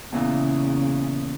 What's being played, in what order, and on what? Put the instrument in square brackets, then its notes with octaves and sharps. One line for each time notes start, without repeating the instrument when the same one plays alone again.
[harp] E2 A#2 E3 [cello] C#3